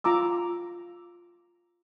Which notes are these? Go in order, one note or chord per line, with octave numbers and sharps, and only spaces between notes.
F4 A#5 D6 E6